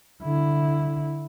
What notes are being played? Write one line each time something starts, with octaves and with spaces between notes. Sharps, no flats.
D3 E4